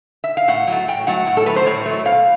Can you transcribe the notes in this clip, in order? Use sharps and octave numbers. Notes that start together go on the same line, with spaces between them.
E5
F5
A2 F#5
F#3 A3
A2 G5
F#3 A3 F#5
A2
A4
F#3 A3 B4
C5
A2 C#5
F#3 A3
B2 F5